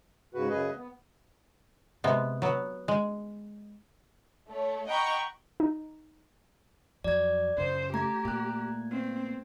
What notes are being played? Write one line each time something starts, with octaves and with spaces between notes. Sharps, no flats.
G#2 C#3 F#4 B4
F#2 C#3 G#4 B4 D#5
B3
C3 G#3 B3
F#3 B3
G#3
A3 C#5
D#5 F#5 G5 A#5 B5 C#6
D#4
F2 F#3 D5 G#6
F#2 C#3 C5
A3 G4 A#5 G#6
A#2 A#5 F#6
B3 C4